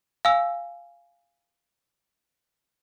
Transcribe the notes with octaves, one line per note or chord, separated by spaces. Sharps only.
F5 G#5 E6